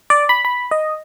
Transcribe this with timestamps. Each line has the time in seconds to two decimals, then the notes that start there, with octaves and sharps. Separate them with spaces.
0.10 D5
0.29 B5
0.45 B5
0.71 D#5